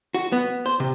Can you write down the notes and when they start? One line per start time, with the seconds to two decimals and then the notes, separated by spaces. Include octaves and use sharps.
0.14 F#4
0.32 B3
0.66 C5
0.80 C3